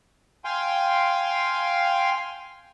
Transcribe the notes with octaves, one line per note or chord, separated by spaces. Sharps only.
F5 G5 G#5 C6